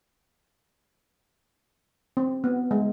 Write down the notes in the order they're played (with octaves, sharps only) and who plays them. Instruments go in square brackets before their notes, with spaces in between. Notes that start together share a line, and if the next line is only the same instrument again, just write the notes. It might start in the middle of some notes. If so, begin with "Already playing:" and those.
[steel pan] C4
B3
G#3